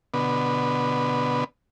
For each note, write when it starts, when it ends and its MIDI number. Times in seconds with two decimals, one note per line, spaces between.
0.14 1.44 47
0.14 1.44 50
0.14 1.44 59